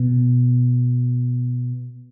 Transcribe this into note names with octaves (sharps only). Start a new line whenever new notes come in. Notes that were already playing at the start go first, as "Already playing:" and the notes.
Already playing: B2